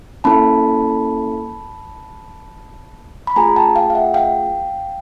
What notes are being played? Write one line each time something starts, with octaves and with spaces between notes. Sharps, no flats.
A#3 C#4 E4 A4 A5 B5
B5
A3 C#4 F4 G#4 G#5 A#5
G5 A5
F5 G5
F5
E5 F#5
F5 G5